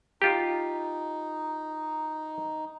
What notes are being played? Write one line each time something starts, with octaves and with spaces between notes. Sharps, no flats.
D#4 F4 G4